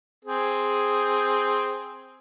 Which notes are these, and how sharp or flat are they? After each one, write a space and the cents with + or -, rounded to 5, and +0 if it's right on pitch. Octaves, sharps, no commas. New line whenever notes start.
C4 +0 G#4 +0